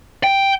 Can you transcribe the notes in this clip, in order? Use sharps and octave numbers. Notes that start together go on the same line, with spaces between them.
G5